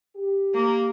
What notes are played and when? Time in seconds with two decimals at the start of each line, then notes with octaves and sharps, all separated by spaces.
0.16 G4
0.54 A#3